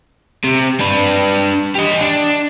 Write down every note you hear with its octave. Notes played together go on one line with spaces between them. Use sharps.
C3
D4 B4
G4 D#5
D4